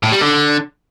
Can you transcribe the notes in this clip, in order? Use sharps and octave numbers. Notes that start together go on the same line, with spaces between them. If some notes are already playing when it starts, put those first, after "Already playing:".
A2
G3
D3